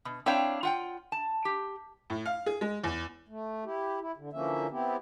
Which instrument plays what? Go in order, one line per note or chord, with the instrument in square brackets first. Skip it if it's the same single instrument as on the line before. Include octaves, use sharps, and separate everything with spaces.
[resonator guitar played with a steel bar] B2
C4 D4 E4 C#5 F5 G5
F4 F#5 G5
A5
G4
[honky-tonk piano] A2
F5
G#4
G#3
E2
[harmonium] A3
E4 G4
E4
D3
D3 E3 F3 A#3 C#4 E5
B3 C4 E4 G4